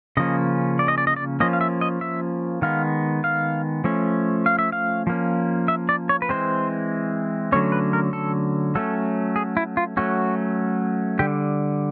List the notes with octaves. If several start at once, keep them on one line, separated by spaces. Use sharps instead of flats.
C#3 F3 A#3 C#4 D#5
D5
D#5
D5
D#5
D5
F3 A#3 C#4 D#5
F5
E5
D#5
E5
D#3 G#3 B3 F5
F5
F3 A3 C#4
F5
E5
F5
F3 A#3 C#4
E5
D5
C#5
B4
E3 G#3 C4 C5
D3 F#3 A3 C#4 C#5
B4
A#4
A4
F#3 A3 C#4 A4
G#4
E4
F4
F#3 A3 C#4 F#4
D3 G3 G4